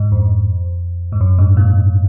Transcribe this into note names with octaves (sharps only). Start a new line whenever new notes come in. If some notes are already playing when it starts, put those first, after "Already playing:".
Already playing: G#2
F2
G#2
F#2
G#2
A#2